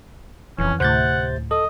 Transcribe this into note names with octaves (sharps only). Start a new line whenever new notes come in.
D#1 F2 E3 C#4
D2 A2 C3 C5 F#5 G6 A6
A4 D#5